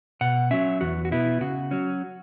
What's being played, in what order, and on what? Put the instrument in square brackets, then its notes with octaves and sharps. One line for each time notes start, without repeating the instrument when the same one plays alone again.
[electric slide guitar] B2 F#5
F#3 C#4 E5
E2 F#4
F#4
B2 B3 E4
C#3 F#4
F#3 C#4